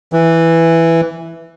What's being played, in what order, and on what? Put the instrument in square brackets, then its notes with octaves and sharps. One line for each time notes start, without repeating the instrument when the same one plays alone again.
[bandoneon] E3